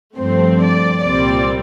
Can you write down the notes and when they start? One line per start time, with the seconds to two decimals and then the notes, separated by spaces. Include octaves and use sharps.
0.16 G2 F3 A3 C4 C5
0.60 D5
1.04 C2 A#2 G3 C4 D5